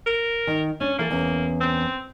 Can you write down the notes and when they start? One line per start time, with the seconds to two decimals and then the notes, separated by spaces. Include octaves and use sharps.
0.06 A#4
0.47 D#3
0.80 C#4 D4 C#5
0.99 E3 A#3 A4
1.10 E2 C#4
1.61 C4